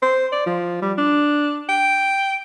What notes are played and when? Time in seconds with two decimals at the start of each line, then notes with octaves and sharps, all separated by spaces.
0.02 C5
0.32 D5
0.46 F3
0.82 G3
0.98 D4
1.68 G5